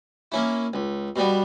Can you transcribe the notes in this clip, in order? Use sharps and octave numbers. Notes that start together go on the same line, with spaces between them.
A#3 C#4 E4
C#2
B2 G3 B3